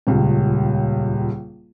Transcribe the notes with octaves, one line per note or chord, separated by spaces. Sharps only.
D#1 C#2